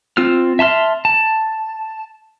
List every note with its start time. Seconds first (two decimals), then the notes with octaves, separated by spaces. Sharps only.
0.17 C4 F4 E6 F6
0.59 E5 A5 C6 F6
1.05 A5